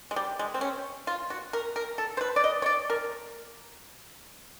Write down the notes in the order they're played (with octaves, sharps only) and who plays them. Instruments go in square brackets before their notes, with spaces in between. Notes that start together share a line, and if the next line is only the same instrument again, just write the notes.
[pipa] G#3
G3
G#3
C4
C#4
F4
F#4
A#4
A#4
A4
C5
B4
D5
D#5
C#5
D5
A#4